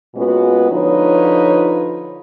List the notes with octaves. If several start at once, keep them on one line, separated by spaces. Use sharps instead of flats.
A#2 G#3 B3 C#4 F#4 B4
D3 F3 D#4 F4 B4 C#5